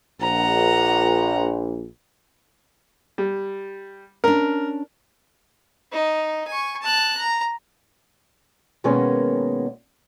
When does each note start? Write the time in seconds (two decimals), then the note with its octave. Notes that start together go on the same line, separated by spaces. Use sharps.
0.21 A#1 F#5 A#5
3.18 G3
4.24 C#4 D4 A#4
5.92 D#4
6.48 G#5 C#6
6.82 A5 F#6
7.18 A#5
8.84 B2 D#3 G#3 A#3 B3 C#4